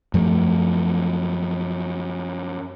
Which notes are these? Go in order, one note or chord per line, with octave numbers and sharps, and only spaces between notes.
F#2 F3 A3